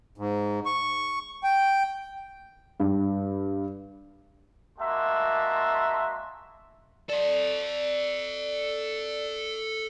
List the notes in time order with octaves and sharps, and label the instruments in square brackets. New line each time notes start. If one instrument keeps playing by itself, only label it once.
[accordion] G#2
C#6
G5
[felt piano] G2
[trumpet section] G#3 A#3 F#4 E5 A5 C6
[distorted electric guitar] A4 D#5 [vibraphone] D5